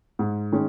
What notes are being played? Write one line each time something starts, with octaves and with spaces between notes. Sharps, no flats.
G#2
D#3 G#3 C#4